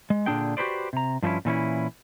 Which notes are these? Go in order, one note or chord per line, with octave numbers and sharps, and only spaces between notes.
G#3
A#2 D3 D4 G#4 G5
F#4 G4 A4 B4 C5 D5
C3 A#5
G2 F3 A3 C#4 E4
A#2 E3 C#4 E4